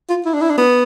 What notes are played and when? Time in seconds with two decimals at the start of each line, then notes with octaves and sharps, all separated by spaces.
0.09 F4
0.25 E4
0.33 D4
0.41 E4
0.50 D4
0.58 B3